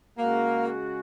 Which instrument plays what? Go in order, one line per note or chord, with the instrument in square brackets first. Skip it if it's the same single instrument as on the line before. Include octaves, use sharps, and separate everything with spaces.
[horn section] C#3 G#3 F#4 [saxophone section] A#3